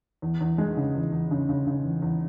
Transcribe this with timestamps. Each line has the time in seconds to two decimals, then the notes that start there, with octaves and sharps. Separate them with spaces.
0.22 E2
0.41 E2
0.58 G#3
0.77 C#3
0.95 E2
1.12 E2
1.31 C#3
1.49 C#3
1.67 C#3
1.85 E2
2.02 E2